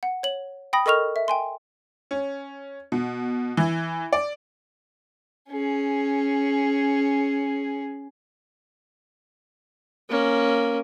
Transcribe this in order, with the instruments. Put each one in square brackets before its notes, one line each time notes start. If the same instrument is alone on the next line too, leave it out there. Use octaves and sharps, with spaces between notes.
[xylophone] F#5
C#5 F#7
G5 B5 D#6 A#6
A4 A#4 D#5 C#6 F6 F7
E5
G5 G#5 C6
[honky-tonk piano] C#4
B2
E3
D5
[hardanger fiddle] C#4 G#4
[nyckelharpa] A#3 C#4